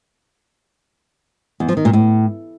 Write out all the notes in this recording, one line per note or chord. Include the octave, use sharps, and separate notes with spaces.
E2
F3
D#3
A#2
A2